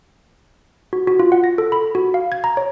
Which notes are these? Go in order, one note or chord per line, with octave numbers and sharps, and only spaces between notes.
F#4
F#4
F4
F#5
A#6
A4
B5
F#4
F5
G#6
A#5
C#5